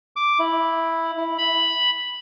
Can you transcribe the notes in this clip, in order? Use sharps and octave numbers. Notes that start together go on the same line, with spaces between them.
D6
E4
E4
B5